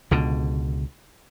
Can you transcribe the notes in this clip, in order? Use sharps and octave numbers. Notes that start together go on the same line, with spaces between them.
C#2 B2 D3